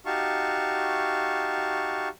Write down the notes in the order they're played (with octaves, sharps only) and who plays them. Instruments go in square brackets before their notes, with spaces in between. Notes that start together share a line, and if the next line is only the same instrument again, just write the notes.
[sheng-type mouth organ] D#4 F#4 G4 F5 A5 C#6